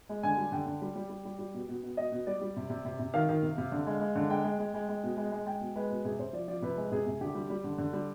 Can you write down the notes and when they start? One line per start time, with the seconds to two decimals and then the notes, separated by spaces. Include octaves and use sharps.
0.09 G#3
0.23 D3 G#5
0.38 G3
0.52 D3 G5
0.66 D3
0.82 G3
0.96 G3
1.10 G3
1.25 G3
1.39 G3
1.54 B2
1.69 B2
1.83 B2
1.97 B2 D#5
2.12 B2
2.27 G3 D5
2.41 G3
2.56 C3
2.70 C3
2.85 C3
2.99 C3
3.14 D#3 F5
3.29 D#3
3.43 C3
3.58 C3
3.72 D3
3.87 G#3
4.01 G#3
4.16 D3
4.30 G#3 G5
4.44 G#3
4.59 G#3
4.74 G#3
4.89 G#3
5.03 B2
5.17 G#3
5.32 G#3
5.46 G#3 G5
5.61 B2
5.76 G#3 B4
5.90 B2
6.05 C3 G#4
6.19 C3 C5
6.33 F3 D5
6.48 F3 D5
6.62 C3 B4
6.77 G#3
6.92 C3 G#4
7.07 C3
7.21 D3 G4
7.35 G3
7.50 G3
7.64 D3
7.78 D3
7.93 G3